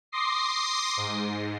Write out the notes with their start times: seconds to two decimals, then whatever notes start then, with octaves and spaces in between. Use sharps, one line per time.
0.12 C6 D6 D#6 A#6 C7
0.97 G#2